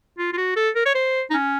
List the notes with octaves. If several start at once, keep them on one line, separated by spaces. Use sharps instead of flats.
F4
F4
F#4
A4
A#4
C#5
C5
D#4
C#4